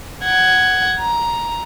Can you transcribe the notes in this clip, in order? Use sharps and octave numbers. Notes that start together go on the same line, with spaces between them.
F#5 G#6
A#5